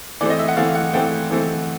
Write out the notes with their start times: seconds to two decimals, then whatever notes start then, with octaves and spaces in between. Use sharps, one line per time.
0.21 E3 A3 C4 D5
0.30 D#5
0.39 E5
0.48 F#5
0.57 E3 A3 C4 F5
0.75 F#5
0.93 E3 A3 C4 G5
1.31 E3 A3 C4